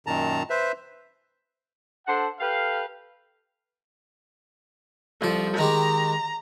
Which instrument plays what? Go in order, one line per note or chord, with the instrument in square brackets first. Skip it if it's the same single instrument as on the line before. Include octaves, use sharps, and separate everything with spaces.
[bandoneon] F#2 A#2 D#3 A5 A#5
B4 C5 E5
[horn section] D4 A4 C5 F#5
G4 A4 B4 F5
[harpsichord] C2 A4 [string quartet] F3
[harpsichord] D#3 G#3 G4 [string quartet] A#5